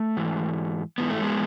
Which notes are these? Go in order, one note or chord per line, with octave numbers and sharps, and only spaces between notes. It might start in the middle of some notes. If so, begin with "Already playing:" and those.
Already playing: A3
G#2 E3
G#2 E3 B3
A3
G#3 B3